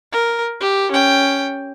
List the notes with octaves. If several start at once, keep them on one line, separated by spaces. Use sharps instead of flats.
A#4
G4
C#4 G5